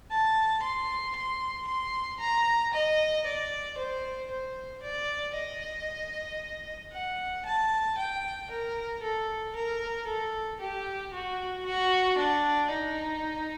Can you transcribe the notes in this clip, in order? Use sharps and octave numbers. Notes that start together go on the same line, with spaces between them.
A5
C6
C6
C6
A#5
D#5
D5
C5
C5
D5
D#5
F#5
A5
G5
A#4
A4
A#4
A4
G4
F#4
F#4
D4
D#4